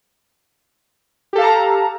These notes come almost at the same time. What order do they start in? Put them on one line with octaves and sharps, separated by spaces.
G4 A4 F5 A5 A#5